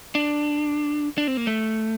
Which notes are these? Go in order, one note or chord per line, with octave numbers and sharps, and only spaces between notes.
D4
D4
C4
A#3
A3